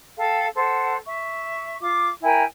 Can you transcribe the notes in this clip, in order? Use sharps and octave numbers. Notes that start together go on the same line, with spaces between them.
A4 F5 G5
A4 C5 F#5
E5 C#6
F4 D6
E4 A#4 G5 G#5